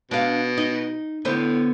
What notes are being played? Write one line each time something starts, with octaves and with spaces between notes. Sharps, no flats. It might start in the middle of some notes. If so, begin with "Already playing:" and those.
B2 D4 F5
D#4
A2 D3 B3 C5